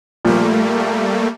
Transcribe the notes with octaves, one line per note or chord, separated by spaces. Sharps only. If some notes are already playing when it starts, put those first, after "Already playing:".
A#2 F3 G3 A3 A#3